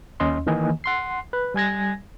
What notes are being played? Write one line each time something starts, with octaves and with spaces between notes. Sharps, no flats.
D#2 C#4 D#5 C6
D#3 E3 A#3 D#5 G#5
F#5 C6 C7
B4
G3 G#5 G#6 A#6